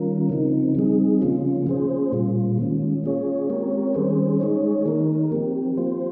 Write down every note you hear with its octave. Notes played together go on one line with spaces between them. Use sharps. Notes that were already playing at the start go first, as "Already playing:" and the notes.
Already playing: D#3 G3 C#4 F4 A#4
C#3 F3 C4 D#4
G3 C4 D#4 G#4
C#3 F3 A#3 C#4 F4
A#3 C#4 G#4 C5
A#2 G3 A#3 F4
D#3 G#3 C#4
A#3 C#4 F4 G#4 C#5
G#3 C4 G4 A#4 C#5
D#3 G3 C#4 G#4 C5
G#3 D#4 G#4 C#5
D#3 A#3 D#4 A#4
F3 C4 G4
A#3 F4 C5